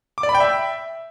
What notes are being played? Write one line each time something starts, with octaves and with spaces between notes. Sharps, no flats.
D6
D5
B5
G5
E5